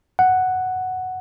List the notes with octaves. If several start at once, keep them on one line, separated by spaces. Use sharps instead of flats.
F#5